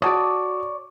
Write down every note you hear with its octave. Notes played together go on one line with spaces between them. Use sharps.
F#4 C#5 D5 A5 D#6